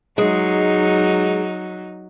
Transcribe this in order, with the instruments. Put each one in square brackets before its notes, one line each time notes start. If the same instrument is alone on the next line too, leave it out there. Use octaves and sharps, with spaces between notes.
[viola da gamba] F#3 D#4 [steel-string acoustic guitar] G#3